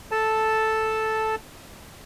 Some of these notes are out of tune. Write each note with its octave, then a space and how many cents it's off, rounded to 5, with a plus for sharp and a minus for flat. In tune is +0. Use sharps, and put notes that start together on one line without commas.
A4 -5 A5 +0